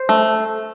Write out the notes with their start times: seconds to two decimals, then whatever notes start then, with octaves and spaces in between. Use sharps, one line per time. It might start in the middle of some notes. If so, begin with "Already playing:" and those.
Already playing: C5
0.09 A3